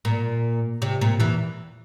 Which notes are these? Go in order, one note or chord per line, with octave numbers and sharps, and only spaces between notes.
A#2
C3
A#2
E2 E3